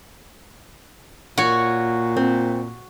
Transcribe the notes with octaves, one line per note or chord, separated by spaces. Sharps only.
A#2 F#4 C#5
C4